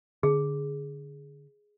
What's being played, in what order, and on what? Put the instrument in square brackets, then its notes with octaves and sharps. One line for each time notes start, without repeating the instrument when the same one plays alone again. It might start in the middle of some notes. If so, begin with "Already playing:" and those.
[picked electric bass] D3 [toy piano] G#4